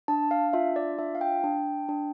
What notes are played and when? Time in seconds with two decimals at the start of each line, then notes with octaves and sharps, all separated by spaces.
0.08 D4 A5
0.31 F5
0.53 F4 E5
0.76 D5
0.99 D4 E5
1.15 F5
1.21 G5
1.44 D4
1.89 D4